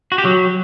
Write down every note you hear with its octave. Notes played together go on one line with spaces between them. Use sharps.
F#4
G4
F#3